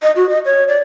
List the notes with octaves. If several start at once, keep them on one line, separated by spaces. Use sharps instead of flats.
D#5
F#4
D#5
C#5
D5